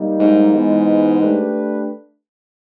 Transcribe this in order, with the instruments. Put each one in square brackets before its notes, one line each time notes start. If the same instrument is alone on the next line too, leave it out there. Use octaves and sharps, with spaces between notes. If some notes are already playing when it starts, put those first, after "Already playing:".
Already playing: [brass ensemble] G3 A#3 D#4
[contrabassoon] G#2
[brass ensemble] E3 G#3 B3
A3 D4 G4 B4